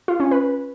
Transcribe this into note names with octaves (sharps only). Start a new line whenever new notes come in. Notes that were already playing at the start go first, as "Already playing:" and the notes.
F4
C#4
B4